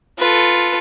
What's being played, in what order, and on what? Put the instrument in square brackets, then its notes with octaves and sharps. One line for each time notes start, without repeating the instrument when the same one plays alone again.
[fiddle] F4 [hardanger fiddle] A4 B4